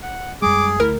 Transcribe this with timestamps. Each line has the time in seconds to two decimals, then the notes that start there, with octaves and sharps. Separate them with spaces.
0.02 F#5
0.42 F#2 G3 G#3 G#4 D6
0.80 D2 A3 E4 A#4